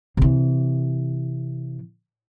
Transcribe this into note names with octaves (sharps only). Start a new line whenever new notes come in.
C3 E3